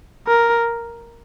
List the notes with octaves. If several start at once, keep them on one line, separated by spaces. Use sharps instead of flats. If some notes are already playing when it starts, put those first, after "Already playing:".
A#4